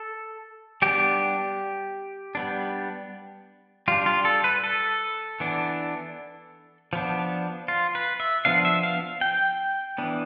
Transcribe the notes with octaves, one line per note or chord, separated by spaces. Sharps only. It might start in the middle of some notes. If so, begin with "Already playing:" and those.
Already playing: A4
G3 B3 D4 G4
G3 B3 D4
G3 D4 F4
F4
A4
B4
A4
E3 B3 D4
F3 B3 D4
F4
B4
E5
F3 B3 D4 F5
E5
F5
G5
E3 B3 D4